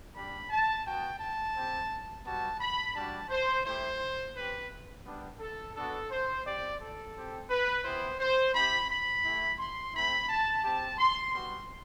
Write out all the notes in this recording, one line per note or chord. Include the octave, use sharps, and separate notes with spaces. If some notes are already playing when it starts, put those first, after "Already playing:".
G3 D4 G4 B5
A5
B3 F#4 G5
A5
C4 G4
G3 B3 F#4 A5
B5
G3 D4 F#4 A5
C5
A3 E4 G4 C5
C4 G4 B4
G3 B3 D4
A4
B3 D4 F#4 A4
C5
C4 G4 D5
A4
C4 G4
B4
B3 E4 G4 C5
C5
C4 E4 G4 B5
B5
A3 E4 G4
C6
A3 C4 E4 B5
A5
C4 G4 A5
C6
G3 B3 F#4 C6